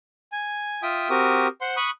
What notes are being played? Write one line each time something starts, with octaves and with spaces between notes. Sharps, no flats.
G#5
F4 E5 G5 D#6
C4 F#4 G4 A#4 D#6
C5 F#5 C6
B5 C#6 D#6 F#6